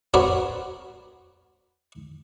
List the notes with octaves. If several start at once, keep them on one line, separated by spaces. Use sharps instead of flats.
C4 F#4 A#4 B4 C#5 D5